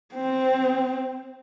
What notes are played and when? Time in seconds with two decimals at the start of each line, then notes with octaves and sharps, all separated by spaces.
0.14 C4